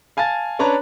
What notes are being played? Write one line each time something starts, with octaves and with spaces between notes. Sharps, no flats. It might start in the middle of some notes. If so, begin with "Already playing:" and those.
F5 G#5 A5 A6
C#4 D4 B4 C#5 A5 A#5